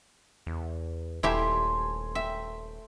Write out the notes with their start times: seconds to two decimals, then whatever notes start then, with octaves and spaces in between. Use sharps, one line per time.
0.46 E2
1.23 D#1 A3 E4 G4 E5 G#5 C6
2.15 E5 G5